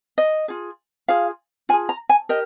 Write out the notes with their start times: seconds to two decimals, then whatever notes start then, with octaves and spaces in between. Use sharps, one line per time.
0.18 D#5
0.48 F4 G#4
1.08 F4 G#4 F5
1.69 F4 G#5
1.73 G#4
1.89 A#5
2.09 G#5
2.29 G4 A#4 D#5